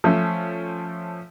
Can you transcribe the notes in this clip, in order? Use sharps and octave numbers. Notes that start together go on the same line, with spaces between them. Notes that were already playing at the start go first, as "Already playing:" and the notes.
F3 A3 C#4